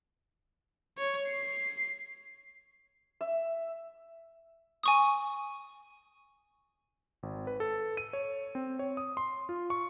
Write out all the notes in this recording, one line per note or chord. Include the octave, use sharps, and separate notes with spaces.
C#5
C7
E5
G#5 C#6 D#6
G#1
B4
A4
D#7
C#5
C4
C#5
D#6
C6
F4
C#6